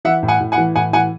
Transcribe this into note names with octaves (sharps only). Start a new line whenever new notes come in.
E3 E5 F#5
A2
F#5 G#5
A2
F#5 G#5
E3
A2 F#5 G#5
E3 F#5 G#5